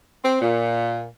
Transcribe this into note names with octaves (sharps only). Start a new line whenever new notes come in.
C4
A#2